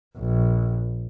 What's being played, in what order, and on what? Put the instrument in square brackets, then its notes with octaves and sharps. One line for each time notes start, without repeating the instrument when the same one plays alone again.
[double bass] A#1